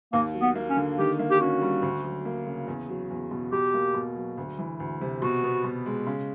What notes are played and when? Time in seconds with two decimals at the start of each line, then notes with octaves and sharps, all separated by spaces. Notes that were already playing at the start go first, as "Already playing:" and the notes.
0.13 D#2 A#3
0.34 F#3
0.41 B3
0.55 A#3
0.70 C#4
0.76 D3
0.99 D#3 G4
1.19 A#3
1.31 G4
1.40 C#4 F#4
1.61 G3
1.82 D2
2.04 F#3
2.25 A#3
2.46 C#3
2.68 E2
2.89 F#3
3.10 E2
3.31 B2
3.52 B2 G4
3.74 A#3
3.94 B2
4.16 F#3
4.38 D2
4.59 E3
4.80 D2
5.01 C3
5.22 B2 F#4
5.44 B3
5.64 B2
5.86 G#3
6.07 C#3